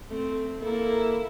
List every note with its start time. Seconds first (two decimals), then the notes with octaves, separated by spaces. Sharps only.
0.10 A3 C4
0.61 A#3 E4 A4